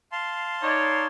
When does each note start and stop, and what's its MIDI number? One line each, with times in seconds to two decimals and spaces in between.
0.12 1.06 77
0.12 1.06 81
0.12 1.06 84
0.63 1.07 63
0.63 1.07 73
0.63 1.07 74